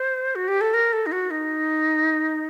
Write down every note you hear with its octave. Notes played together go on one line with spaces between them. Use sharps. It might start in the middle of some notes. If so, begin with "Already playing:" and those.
Already playing: C5
F#4
G4
A4
A#4
A4
D#4
F#4
D#4